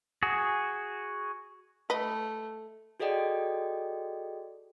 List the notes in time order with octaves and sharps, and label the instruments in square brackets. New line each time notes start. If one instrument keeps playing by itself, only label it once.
[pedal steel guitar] F#4 G#4
[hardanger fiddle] A3 [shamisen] B4 D#5
[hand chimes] F#4 G#4 A4 D5 D#5 G5